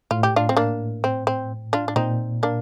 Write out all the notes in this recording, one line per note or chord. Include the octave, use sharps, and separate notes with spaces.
A2 F4
G4
D4 F4
C4
A#3 D4
C4
C4
D4 F4
D4
A#2 C4 D#4
A#3 D4